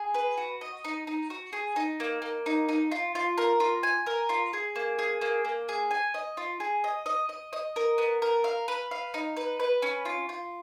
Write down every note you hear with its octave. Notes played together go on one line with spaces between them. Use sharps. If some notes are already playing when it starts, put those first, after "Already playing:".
Already playing: G#4
B4
F#4
D#5
D#4
D#4
F#4
G#4
D#4
A#3
A#3
D#4
D#4
F4
F4
A#4
F4
G#5
A#4
F4
G#4
A#3
G#4
A#3
A#3
G#4
G#5
D#5
F4
G#4
D#5
D#5
D#5
D#5
A#4
B3
A#4
F5
B4
F5
D#4
B4
B4
C#4
F4
F4